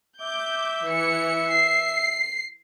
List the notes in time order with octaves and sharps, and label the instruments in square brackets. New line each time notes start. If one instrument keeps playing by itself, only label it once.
[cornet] E5 [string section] D6 G6
[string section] E3 C#7
C7